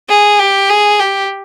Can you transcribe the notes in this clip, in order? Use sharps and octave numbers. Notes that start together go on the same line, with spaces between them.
G#4
G4
G#4
G4